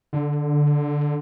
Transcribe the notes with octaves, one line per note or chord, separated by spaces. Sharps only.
D3